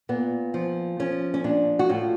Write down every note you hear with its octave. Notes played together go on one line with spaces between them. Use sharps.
A#2 B3
F3
F3 C#4
C#4
A#2 D4
F#4
A2 F4